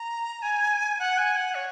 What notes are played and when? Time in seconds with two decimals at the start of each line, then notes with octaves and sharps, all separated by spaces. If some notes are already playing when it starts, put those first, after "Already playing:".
Already playing: A#5
0.42 G#5
0.99 F#5
1.18 G#5
1.37 F#5
1.55 C#5